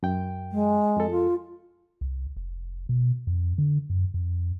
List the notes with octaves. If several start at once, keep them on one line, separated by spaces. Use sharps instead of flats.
F#2 G5
G#3
F2 A4
F4
C2
F1
B2
F2
D3
F#2
F2